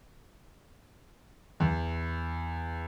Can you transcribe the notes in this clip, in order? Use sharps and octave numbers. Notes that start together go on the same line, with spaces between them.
E2